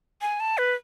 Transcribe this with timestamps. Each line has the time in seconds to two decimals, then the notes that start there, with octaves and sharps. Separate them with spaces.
0.21 G#5
0.40 A5
0.58 B4